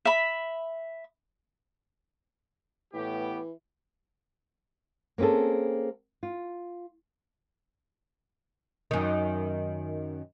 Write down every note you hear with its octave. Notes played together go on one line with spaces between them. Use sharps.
E5 B5
A2 E3 B3 G4
A#3 C4 C#4 G#4 A4
F4
F#2 D#3